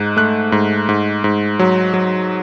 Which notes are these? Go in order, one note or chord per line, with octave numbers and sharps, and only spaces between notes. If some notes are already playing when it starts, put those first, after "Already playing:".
Already playing: G#2 D#4 F#6
A3 F#6
G#2
G#2
G#2
F#3
F#3